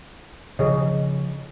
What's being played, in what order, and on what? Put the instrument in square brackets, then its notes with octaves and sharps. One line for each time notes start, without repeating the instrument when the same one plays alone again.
[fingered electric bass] C#3 F3 [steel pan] G#4 C#5 D#5